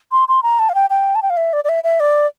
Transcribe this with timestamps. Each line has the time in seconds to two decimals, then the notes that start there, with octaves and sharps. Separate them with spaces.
0.12 C6
0.28 C6
0.43 A#5
0.59 A5
0.69 F5
0.75 G5
0.90 G5
1.15 A5
1.22 G5
1.30 F5
1.37 E5
1.53 D5
1.64 D5
1.69 E5
1.84 E5
2.00 D5